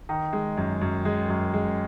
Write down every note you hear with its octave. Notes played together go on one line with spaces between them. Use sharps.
D#3
G#3
F#2
F#2
G#3
F#2
G#3